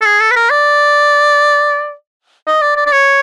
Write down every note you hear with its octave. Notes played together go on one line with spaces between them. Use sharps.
A4
G#4
A4
B4
A#4
D5
D#5
D5
D5
D5
C#5